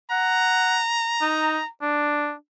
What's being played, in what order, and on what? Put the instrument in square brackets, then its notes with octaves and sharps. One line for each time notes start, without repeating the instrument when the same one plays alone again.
[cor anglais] F#5 [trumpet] A#5
[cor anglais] D#4
D4